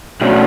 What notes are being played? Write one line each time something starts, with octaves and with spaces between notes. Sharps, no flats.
B2 A3 C#4 D4 F#4